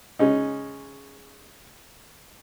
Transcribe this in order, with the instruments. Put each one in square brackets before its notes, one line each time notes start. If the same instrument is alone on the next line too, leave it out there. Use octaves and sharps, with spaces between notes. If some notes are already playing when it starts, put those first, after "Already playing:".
[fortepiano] C#3 G#3 C#4 D#4